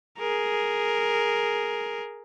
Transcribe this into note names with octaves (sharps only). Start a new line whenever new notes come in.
G#4 A#4